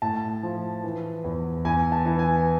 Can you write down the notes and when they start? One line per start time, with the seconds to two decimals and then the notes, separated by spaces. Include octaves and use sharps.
0.02 A2 A5
0.43 F3
0.84 E3
1.24 E2
1.65 E2 G#5
1.92 A5
2.05 E3
2.19 G#5